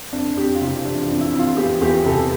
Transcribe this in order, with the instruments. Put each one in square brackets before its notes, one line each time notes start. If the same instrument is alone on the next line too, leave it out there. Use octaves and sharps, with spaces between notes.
[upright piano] F2 D4
F2 G4
F4
C3 E4
E3 D4
D4
F2
E4
F2
F4
E2 G4
E2 G4
C3 A4